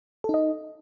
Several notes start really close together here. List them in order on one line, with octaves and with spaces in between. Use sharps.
A4 D#4 D#5